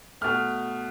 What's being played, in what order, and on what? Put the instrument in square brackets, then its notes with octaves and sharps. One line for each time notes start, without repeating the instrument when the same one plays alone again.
[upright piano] B2 A3 F6